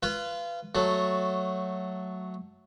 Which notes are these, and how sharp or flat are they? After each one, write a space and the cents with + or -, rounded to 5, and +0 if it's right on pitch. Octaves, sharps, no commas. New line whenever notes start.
F4 -25 B4 +0
F#3 +0 A3 +0